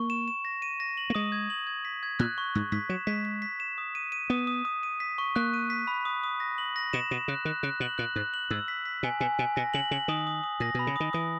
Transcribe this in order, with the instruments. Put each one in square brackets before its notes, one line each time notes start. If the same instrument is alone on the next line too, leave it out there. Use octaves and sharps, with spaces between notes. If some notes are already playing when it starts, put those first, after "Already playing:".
Already playing: [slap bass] A#3 [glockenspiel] C#6
[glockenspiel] E7
E7
A#6
D#7
A#6
F#7
[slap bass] A#3
[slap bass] G#3 [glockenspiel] D#6
[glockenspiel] G#6
F#7
G#6
B6
G#6
[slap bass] A#2 [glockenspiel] F#6
[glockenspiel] C#6
[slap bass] G#2 [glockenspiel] C#6
[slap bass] G#2 [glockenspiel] B6
[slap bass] F#3 [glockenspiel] E7
[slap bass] G#3 [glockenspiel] B6
[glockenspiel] B6
B6
E7
D#6
D#7
D#7
[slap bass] B3 [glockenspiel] D#6
[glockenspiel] D#6
D#6
D#7
B6
C#6
[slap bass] A#3 [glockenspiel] F#6
[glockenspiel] D#7
B6
B5
D#6
D#6
A#6
F#7
A#6
[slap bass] B2 [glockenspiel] E7
[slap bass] B2 [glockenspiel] E7
[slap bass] C#3 [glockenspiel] F#6
[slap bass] D#3 [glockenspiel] F#6
[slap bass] C#3 [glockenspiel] F#6
[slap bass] B2 [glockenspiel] F#7
[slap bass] A#2 [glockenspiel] F#6
[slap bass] G#2 [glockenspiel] F#6
[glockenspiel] F#7
[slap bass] G#2 [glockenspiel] E6
[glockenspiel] B6
B6
[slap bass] B2 [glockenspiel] G#5
[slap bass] B2 [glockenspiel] G#5
[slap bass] B2 [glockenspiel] G#5
[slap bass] B2 [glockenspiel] A#6
[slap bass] C#3 [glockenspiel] F#7
[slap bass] C#3 [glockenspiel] F#7
[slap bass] D#3 [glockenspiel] D#6
[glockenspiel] D#6
D#6
[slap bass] A#2 [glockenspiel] A#6
[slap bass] B2 [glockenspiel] B5
[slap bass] C#3
[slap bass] D#3 [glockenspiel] D#6
[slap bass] E3 [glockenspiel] D#6